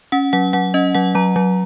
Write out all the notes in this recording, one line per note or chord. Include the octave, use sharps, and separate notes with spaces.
C#4 F#5
F#3 F#5
F#3 F#5
C#4 D#5
F#3 F#5
F#3 A#5
F#3